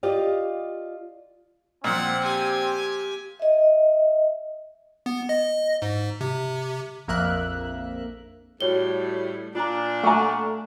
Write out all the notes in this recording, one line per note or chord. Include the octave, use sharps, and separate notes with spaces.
F4 G4 D5 D#5 F5
A#2 F3 C4 F#5
G4 G#5
D#5 E5
B3
D#5
G#2
C3
A#1 F2 A#3 A#4 E5 F#6
A2 G3 F#4 C#5 G7
A#2 D4 F4 A#5
A3 F#5 G#5 A#5 C#6